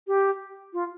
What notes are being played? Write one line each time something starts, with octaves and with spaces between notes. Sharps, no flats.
G4
F4